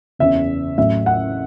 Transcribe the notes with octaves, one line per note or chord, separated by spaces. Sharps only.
F#1 E2 C#3 E5
A1 A2 F#3 E5
F#5